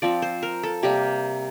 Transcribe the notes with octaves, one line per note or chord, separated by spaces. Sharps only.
F3 C4 D5
C5
A#4
A4
C3 G3 A#3 G4